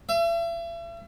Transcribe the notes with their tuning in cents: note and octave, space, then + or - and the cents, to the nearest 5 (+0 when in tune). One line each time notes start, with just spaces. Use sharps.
E5 +40